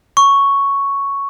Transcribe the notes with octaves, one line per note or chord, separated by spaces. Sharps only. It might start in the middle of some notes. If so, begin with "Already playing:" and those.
C#6